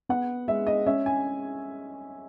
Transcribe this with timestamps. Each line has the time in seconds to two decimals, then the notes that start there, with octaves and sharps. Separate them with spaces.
0.09 B3 F#5
0.48 G#3 E5
0.67 D#5
0.86 C#4 E5
1.06 G#5